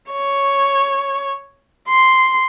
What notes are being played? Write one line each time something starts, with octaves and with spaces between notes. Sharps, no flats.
C#5
C6